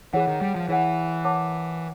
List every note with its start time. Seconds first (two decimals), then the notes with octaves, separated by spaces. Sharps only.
0.13 E3 G#4 C#5 F#5
0.28 D#3
0.41 G3
0.56 F3
0.69 E3 G#4 C#5 F#5
1.25 A#4 C#5 F#5 A5 D6